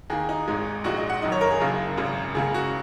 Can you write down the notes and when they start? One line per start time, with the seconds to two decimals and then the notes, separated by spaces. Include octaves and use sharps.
0.10 D#2 D#3 A#3 G#4
0.29 D#4
0.48 G#1 G#2 G#3
0.84 A#1 A#2 G#3 F#4
0.97 D#5
1.10 F#5
1.22 F#1 F#2 D#3 D#5
1.32 C#5
1.41 A#4
1.51 G#4
1.60 F#1 F#2 C#3 A#3
1.97 G#1 F#2 C#3
2.35 C#2 C#3 A#3 G#4
2.54 F#4